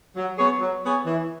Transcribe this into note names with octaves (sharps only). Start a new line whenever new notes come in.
F#3
B3 G#4 C#5
F#3
B3 G#4 C#5
E3